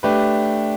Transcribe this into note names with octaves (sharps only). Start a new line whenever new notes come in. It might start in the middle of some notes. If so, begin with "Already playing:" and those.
A3 D4 G4 B4